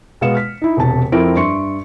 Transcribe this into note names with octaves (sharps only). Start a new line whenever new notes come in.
B2 G#3 B3 F5 C#7 E7
F6 B6
D#4 E4
E1 C3 A5
F2 F3 C4 E4 A#4 D7
G2 E5 C6 C#6 C#7